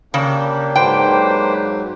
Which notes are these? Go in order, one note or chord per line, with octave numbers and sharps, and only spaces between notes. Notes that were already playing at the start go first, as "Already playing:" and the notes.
C#3 A#3 D4 G4
G#2 F#3 B4 C5 G5